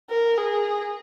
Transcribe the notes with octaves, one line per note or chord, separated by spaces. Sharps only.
A#4
G#4